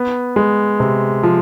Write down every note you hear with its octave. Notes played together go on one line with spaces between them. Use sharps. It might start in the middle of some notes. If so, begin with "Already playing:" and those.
Already playing: B3
G#3
C3
F3